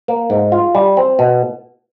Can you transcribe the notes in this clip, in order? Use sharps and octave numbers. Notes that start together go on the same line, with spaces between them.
A#3
G#2
F4
G3
C4
B2